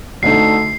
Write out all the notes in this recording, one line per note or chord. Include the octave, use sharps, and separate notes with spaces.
D2 D3 A3 D#4 A4 C7